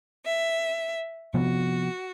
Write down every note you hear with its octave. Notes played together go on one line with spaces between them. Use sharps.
E5
C3 F3 B3 F#4